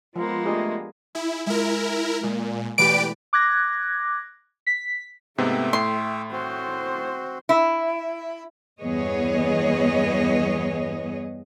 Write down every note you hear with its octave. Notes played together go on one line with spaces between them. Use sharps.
F3 G#3 A#3 B3 F4
A3 D4 F4 G4 G#4 D#5
E4 G#4
G#3 E4 F4 A#4
A#2 G#3
B2 E3 A3 G4 B4 D5 D7
D6 F#6 G#6 A#6
B6
G#2 C3 A3 B3 E5 G5
A2 C6
C4 F#4 C5
E4
E2 G2 B3 G#4 C#5 D#5